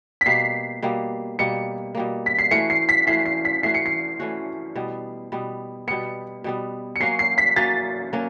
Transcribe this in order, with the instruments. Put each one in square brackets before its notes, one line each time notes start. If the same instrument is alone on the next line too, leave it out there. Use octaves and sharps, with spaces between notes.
[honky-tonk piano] B6
[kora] B2 G3 A#3 [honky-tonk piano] C7
[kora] B2 G3 A#3
[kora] B2 G3 A#3 [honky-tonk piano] C#7
[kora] B2 G3 A#3
[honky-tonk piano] B6
C7
[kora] E3 A3 C#4 F#4 [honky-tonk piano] C#7
[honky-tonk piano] C7
B6
[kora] E3 A3 C#4 F#4 [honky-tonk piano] C7
[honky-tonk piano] C7
B6
[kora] E3 A3 C#4 F#4 [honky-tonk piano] C7
[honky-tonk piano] C#7
C7
[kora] E3 A3 C#4 F#4
B2 G3 B3
B2 G3 B3
[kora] B2 G3 B3 [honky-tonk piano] C#7
[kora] B2 G3 B3
[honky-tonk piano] C#7
[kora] F#3 A#3 C#4 F#4 [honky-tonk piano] C7
[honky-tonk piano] C7
B6
[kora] F#3 A#3 C#4 F#4 [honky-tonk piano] A6
[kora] F#3 A#3 C#4 F#4